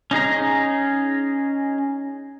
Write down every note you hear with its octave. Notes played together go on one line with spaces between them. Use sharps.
C#4 D#4 G#4 A#5